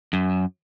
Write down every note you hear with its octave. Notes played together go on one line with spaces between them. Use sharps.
F#2